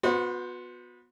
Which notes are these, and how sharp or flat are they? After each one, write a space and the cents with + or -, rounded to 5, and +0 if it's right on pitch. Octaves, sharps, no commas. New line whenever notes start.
B3 +0 F#4 -35 C5 +0